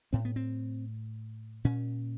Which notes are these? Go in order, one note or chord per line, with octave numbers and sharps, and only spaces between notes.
A2 C4
B3
C4
A#2 C#4